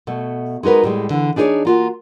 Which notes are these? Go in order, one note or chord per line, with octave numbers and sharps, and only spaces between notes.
B2 A3
G#3 D#4 F#4 A#4 B4
A2 G3 G#3
D3 E3
D4 D#4 G#4 A4 C#5 D5
A#3 F4 F#4